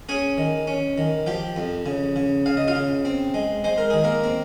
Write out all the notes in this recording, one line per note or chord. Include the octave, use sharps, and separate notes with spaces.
C#4 G#4 G#5
D#3
C#4
D#3
F3 G4 G5
F2
C#3
C#3
C#3 F5
D#5
F4 F5
C#3
C4
G#3
G#3 C5
A#4
D#3 G#4
A#3 A#4
C4